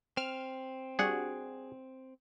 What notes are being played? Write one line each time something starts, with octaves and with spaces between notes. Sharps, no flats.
C4 F6
G3 D4 F#4 G#4 F#5